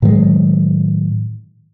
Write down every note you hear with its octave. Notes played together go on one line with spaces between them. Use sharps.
A2 D#3 F#3 G#3